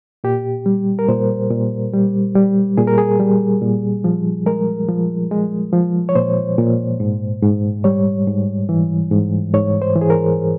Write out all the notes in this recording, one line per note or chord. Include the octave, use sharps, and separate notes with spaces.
A#2 G4
G3
A#4
A#2 C5
A#2
G3
G3
A#2 G#4
A#4
G#4
G3
A#2
F3
G#3 A#4
F3
G#3
F3
C#5
A#2 C5
A#2
G#2
G#2
G3 C#5
G#2
E3
G#2
G#2 C#5
C5
E3
G#4
A#4